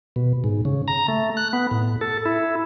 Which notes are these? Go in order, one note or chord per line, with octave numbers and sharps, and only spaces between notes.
B2
G#2
C#3
A#5
A3
F#6
B3
A2
A4
E4